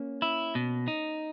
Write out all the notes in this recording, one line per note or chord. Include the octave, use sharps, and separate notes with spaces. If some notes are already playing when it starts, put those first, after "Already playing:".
Already playing: A#3 C#4
E4
B2
D#4